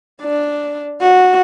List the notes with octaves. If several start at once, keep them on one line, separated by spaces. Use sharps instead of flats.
D4
F#4